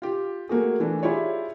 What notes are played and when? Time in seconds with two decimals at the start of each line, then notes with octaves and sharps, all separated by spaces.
0.02 F4 G4
0.49 A3 A#3 F#4 G#4
0.80 E3 A3 D4
1.02 E4 F4 G4 G#4 C#5 D5